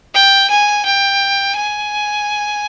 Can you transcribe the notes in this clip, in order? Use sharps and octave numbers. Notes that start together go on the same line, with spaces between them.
G5
G#5
G5
G#5